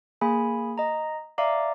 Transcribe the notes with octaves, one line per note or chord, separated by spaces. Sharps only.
A#3 G#4 G#5 B5
D#5 A#5
D5 E5 F5 A#5 D6